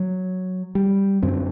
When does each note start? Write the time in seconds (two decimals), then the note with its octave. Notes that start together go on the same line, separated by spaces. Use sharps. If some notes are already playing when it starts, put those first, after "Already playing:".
Already playing: F#3
0.75 G3
1.22 F#2 D3 C4